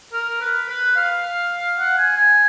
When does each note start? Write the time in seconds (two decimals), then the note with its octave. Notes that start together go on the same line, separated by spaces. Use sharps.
0.13 A#4
0.41 B4
0.69 B4
0.96 F5
1.79 F#5
1.98 G#5
2.16 G#5